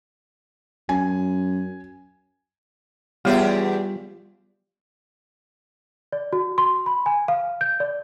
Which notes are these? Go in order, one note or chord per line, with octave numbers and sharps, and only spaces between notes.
F#2 G#5
E2 G3 B3 F4 G4 G#4 C#5 E5
D5
F#4
C6
B5
G#5
F5
G6
D5